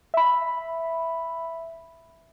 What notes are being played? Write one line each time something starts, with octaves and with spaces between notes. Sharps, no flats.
E5 B5